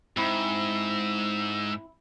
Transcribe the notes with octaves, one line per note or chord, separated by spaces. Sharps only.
G#2 C4 E4 E6